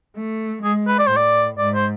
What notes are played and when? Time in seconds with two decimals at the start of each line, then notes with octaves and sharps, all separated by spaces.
0.16 A3
0.63 G#3 G#4
0.87 B4
0.99 D5
1.07 C5
1.11 A2
1.17 D5
1.59 G#2 D5
1.75 C5